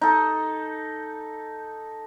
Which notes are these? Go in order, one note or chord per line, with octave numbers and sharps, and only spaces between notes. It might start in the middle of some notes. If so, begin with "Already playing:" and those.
D#4 A4